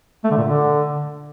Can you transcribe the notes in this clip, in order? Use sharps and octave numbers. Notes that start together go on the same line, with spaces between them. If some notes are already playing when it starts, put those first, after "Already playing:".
A3
D3
A#2
D3